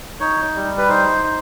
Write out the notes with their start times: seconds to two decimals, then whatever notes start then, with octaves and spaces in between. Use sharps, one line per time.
0.20 D#4 C#5
0.55 G3
0.77 B4
0.89 D#4 C5
1.23 D#4